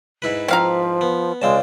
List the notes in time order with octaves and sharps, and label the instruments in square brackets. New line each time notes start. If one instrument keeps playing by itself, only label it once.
[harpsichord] G#2 E4 B4
[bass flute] F3 [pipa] C4 F5 A#5
[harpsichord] B3
[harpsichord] C#2 C4 A5 [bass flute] G#3 [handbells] C#5 D5 F5